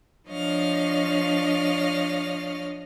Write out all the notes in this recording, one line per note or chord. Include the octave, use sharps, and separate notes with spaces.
F3 D4 C#5 D#5 F5 F6